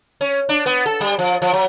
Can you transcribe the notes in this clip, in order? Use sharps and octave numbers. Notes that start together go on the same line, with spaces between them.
C#4
D4
B3
A4
G3
F3
F3
F#3